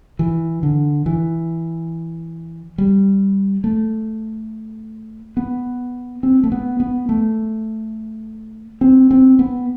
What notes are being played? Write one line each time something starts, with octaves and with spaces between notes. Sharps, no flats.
E3
D3
E3
G3
A3
B3
C4
A3
B3
B3
A3
C4
C4
B3